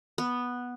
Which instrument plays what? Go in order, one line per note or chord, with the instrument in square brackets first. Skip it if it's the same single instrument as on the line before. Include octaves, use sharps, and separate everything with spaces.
[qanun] B3